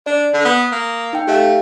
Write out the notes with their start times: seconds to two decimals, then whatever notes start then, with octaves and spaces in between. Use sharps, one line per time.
0.06 D4 D5
0.33 D3
0.45 B3 D#6
0.72 A#3
1.13 D#4 G5
1.27 A3 G4 E5 F5